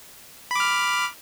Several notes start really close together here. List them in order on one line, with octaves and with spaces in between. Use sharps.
B5 D6 F6